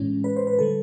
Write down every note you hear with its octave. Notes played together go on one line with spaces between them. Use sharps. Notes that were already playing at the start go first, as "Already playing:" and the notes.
Already playing: A2 E3 G#3 C#4
B4
C5
B4
D3 G3 A4